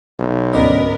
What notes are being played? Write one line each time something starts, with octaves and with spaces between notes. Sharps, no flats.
B1
D2 G#2 B3 C#4 A#4 B4 D5 D#5